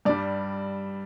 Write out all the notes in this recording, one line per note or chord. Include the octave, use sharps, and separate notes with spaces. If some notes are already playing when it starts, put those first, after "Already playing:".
G2 G3 D5